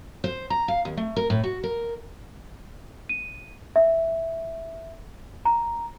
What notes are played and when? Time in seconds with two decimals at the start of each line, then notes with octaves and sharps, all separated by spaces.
0.24 C5
0.50 A#5
0.68 F5
0.85 D#2
0.97 A3
1.16 A#4
1.30 A2
1.44 F#4
1.63 A#4
3.09 D#7
3.76 E5
5.45 A#5